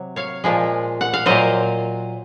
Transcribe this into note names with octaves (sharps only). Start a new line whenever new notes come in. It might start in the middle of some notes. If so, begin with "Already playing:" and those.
Already playing: C3 F#3
C#5 F5
A#2 F3 G#3
F#5
F5
A#2 F#3 C5 D#5